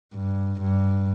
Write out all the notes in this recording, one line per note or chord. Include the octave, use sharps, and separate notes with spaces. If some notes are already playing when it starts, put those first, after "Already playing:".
G2
G2